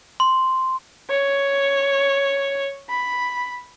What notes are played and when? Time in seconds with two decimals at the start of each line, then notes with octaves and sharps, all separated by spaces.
0.20 C6
1.10 C#5
2.89 B5